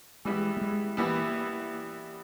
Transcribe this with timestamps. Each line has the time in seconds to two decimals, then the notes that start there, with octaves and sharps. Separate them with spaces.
0.25 E3 G3 G#3 B3 E4
0.57 A3
0.61 G#3
0.97 E3 G3 A#3 B3 E4